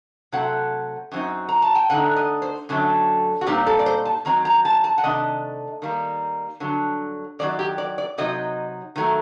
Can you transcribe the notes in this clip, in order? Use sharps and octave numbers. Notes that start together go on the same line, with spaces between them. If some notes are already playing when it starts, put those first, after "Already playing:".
C3 F#3 A3 C4 F#5
F#2 F#3 C4 D#4
A#5
A5
G5
D3 A3 D#4 F#5
D#5
C5
F#2 D3 F#3 A3
F#4
A#2 G3 C4 D#4 G4
A4
D5
C5
A5
D#3 F#3 C4 A#5
A#5
A5
A5
F#5
C3 D#3 A3 D4 D#5
D#3 G3 A#3
G2 D3 F#3
F#2 D#3 F#3 D5
G4
D5
D5
C3 F#3 C4 D#4 D#5
D#3 F#3 A3